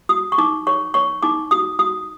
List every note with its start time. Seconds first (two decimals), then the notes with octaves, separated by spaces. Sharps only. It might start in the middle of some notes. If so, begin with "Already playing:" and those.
0.09 F#4 D#6
0.32 C#6
0.38 D#4 D6
0.67 C#5 C#6
0.94 C#5 C#6
1.23 D#4 D6
1.51 F#4 D#6
1.79 F#4 D#6